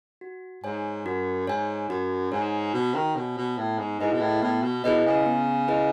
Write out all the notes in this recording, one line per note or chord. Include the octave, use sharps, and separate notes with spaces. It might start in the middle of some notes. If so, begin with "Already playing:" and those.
F#4
G#2 C#5 G#5
F#2 F#4
G#2 C#5 G#5
F#2 F#4
G#2 C#5 G#5
B2 F#4
D#3
B2 C#5 G#5
B2
A2 B3
G#2
G#2 E4 G#4 B4 D#5
B2
A2
A2 B3
B2
B2 E4 G#4 B4 D#5
C#3
B3
E4 G#4 B4 D#5